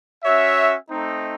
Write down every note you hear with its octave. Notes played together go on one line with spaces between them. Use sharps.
C#4 F#4 C#5 E5
A3 C4 D#4